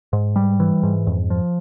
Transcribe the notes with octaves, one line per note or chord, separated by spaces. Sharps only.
G#2
G3
E3
G#2
F2
F3